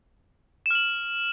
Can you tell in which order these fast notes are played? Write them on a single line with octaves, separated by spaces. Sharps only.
E7 F6 F#7